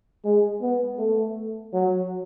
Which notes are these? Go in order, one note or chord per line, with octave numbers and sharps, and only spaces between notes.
G#3
B3
A3
F#3